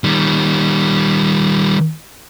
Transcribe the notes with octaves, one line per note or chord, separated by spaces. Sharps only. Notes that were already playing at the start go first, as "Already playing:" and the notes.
D#3 G3